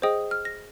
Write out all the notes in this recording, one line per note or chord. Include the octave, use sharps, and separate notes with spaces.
G#4 C5 D#5 G5 D#6
F6
A#6